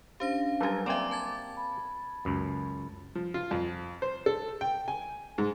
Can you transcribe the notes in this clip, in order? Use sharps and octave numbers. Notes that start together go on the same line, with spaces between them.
C#4 D4 G4 C5 F5 A#6
F#3 G3 G4 A4 A#4 G#5
A#3 C4 D5 E5 G#5 D6
A5 G#6 A6
B5
C#2 F#2
F3
F4
F2
C5
A4
G5
G#5
G#2